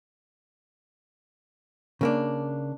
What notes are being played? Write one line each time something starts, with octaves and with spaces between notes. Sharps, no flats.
C#3 A#3 D4